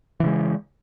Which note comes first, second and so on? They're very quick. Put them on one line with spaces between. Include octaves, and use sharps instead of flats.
E3 C#3 G#3